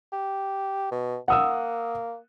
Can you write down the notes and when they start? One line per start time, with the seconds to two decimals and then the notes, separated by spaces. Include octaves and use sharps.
0.12 G4
0.91 B2
1.28 A#3 F#5 D#6 E6